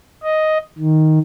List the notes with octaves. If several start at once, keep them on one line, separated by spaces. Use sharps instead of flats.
D#5
D#3